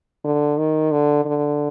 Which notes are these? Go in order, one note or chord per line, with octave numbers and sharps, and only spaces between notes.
D3
D#3
D3
D3